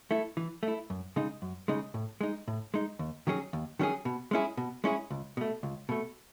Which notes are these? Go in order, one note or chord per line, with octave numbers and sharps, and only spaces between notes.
A3 E4
E3
A3
E4
F#2
C#3 G#3 D#4
F#2
C#3 G#3 D#4
A2
G#3 D#4
A2
G#3 D#4
D#2
D#3 F#3 C#4 G#4
D#2
D#3 F#3 C#4 G#4
B2
G#3 C#4 E4 G#4
B2
G#3 C#4 E4 G#4
C#2
B2 A3
C#2
B2 A3